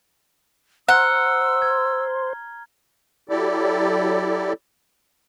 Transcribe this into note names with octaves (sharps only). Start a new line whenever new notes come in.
C5 F#5 A#5 E6 F6 G7
G#6
F#3 E4 G4 A4 D5